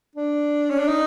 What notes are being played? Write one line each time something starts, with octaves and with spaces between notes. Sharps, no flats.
D4
C#4
D4
D#4